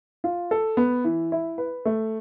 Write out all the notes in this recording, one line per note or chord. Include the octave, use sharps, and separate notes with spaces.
F4
A4
B3
E3
E4
B4
A3